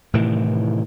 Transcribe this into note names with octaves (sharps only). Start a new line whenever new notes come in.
A2 C3 D#3 E3